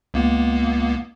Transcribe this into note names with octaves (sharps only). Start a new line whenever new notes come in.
C#2 A#3 B3